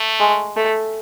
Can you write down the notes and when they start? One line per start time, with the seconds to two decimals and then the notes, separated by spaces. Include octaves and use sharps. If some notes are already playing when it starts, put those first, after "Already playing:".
Already playing: A3
0.20 G#3
0.56 A3